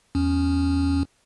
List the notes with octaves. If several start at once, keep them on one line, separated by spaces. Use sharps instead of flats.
E2 C#4